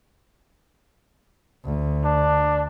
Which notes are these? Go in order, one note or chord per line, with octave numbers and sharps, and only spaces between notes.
D2
D4